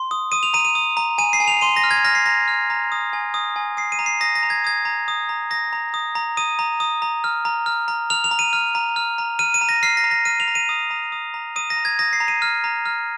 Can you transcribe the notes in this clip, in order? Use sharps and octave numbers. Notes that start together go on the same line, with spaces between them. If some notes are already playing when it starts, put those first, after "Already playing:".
Already playing: C6
D#6
D#6 D#7
F7
A#5 D#7
D#7
D#6
A#5
G#5 D#7
C7
G#5
F7
C6 D#7
A#6
F6
G#6
F6 A#6
C7
A#5 A#6
F6
A#5
D#6
G#5
D#6
G#5
D#6 C7
D#7
A#5
C7
D#6 A#6
A#6
A#5
G#6
D#6 G#6
A#5
D#6
A#5
D#6 A#6
A#5
D#6
A#5
D#6 D#7
A#5
D#6
A#5
F6
A#5
F6
A#5
F6 F7
F7
A#5
D#7
F6
A#5
F6
A#5
F6 D#7
D#7
A#5
A#6
F6 C7
A#6
A#5
A#6
F6 D#7
F7
A#5
D#7
D#6
A#5
D#6
A#5
D#6 D#7
A#6
A#5
G#6
D#6 A#6
C7
A#5
D#7
F6
A#5
F6